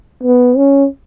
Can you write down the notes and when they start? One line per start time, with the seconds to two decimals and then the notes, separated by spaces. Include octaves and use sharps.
0.23 B3
0.56 C#4